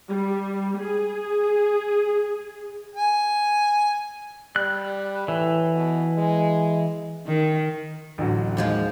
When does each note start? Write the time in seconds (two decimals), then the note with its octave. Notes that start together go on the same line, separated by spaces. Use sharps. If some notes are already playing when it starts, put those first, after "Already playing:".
0.11 G3
0.79 G#4
2.95 G#5
4.56 G3 F#6
5.28 A2 E3
5.75 B2
6.18 G#3
7.26 D#3
8.18 A1 D2 F#3
8.57 D#2 F3 G#3